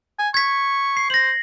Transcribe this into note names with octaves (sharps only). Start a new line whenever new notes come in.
G#5
C#6 G#6 B6
C7
C5 A#6 F#7